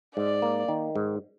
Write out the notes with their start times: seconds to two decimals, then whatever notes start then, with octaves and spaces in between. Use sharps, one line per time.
0.16 G#2 D5
0.42 A#3
0.68 D#3
0.96 G#2